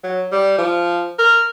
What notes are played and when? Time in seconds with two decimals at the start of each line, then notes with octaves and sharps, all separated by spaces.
0.03 F#3
0.32 G3
0.58 F3
1.18 A#4